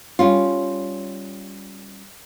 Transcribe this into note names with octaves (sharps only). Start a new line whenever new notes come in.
G3 C#4 F4